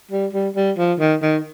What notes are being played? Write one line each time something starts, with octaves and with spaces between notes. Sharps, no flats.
G3
G3
G3
F3
D#3
D#3